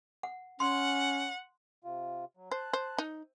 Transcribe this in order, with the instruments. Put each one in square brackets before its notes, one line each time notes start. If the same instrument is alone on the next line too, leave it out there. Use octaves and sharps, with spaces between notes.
[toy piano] F#5
[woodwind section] C#4 [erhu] F#5 [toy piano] C6
[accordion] C3 F4
F#3
[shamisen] C5 [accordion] A5 F#6
[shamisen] C5
D#4